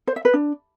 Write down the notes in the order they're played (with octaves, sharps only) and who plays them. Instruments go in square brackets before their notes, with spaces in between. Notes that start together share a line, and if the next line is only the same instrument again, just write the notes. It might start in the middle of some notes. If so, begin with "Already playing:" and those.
[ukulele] C5
E5
B4
D4